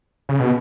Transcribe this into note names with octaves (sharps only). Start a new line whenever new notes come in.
C#3
B2